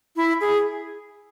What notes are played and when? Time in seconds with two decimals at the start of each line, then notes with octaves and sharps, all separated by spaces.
0.16 E4
0.41 G#4